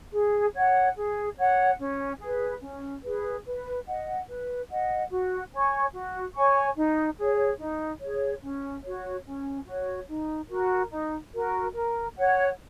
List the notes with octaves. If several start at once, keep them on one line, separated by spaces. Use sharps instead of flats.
G#4
C#5 F#5
G#4
C#5 F#5
C#4
G#4 B4
C#4
G#4 B4
B4
D#5 F#5
B4
D#5 F#5
F#4
C#5 G#5 C#6
F#4
C#5 G#5 C#6
D#4
G#4 C#5
D#4
G#4 C#5
C#4
F#4 C#5
C#4
F#4 C#5
D#4
F#4 A#4
D#4
F#4 A#4
A#4
C#5 F#5